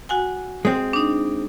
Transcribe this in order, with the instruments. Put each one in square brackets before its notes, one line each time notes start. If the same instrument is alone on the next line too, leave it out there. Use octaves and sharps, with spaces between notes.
[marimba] F#4 F#5 G#5
[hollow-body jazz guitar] G#3 C4
[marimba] D4 D#4